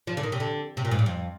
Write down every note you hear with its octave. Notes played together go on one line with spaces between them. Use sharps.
F3
D3
D#3
C3
D3
C3
A#2
G#2
G2
F2